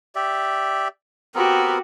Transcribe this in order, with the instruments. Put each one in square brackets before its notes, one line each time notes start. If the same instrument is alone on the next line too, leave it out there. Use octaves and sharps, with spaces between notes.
[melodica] G4 D5 E5
[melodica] B3 C4 A#4 [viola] F#4 G4